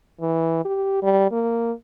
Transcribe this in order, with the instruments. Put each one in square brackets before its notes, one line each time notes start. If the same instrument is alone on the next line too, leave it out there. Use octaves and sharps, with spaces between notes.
[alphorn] E3
G4
G3
A#3